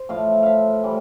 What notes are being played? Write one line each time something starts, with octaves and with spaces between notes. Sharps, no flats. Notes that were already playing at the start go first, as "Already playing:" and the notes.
Already playing: C5
A2 F3 A3 F5
E5 F5
A2 E3 G3